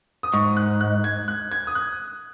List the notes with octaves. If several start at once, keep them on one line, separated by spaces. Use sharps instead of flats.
D#6
G#2 C#6
F#6
F#6
G#6
F#6
G#6
D#6
F#6